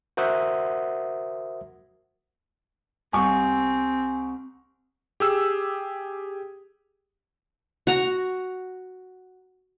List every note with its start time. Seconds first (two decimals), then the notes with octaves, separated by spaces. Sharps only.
0.17 F#4 A#4 C5 E5 F#5 D#6
3.13 C2 C4 G#5 C#6
5.20 G4 G#4 E6
7.87 F#4 A#5